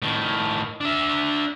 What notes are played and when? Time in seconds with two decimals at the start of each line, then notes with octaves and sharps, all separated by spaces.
0.02 A2 D#3
0.81 D4 E5